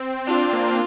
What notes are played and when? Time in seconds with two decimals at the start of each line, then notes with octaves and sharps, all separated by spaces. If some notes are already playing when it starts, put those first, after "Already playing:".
Already playing: C4
0.27 D4 F4
0.39 C4
0.53 A#3
0.66 C4